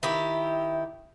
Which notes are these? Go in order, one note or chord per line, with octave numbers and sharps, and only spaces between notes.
D#3 E4 G4 E5